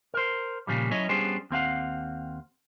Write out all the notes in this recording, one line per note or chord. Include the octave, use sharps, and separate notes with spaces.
A#4 C5
A#2 C#3 F3 G3
F#3 C#4 E4 C#5 D#5
G3 B3 C#4 D4 G#4 C5
D#2 C4 F5 F#5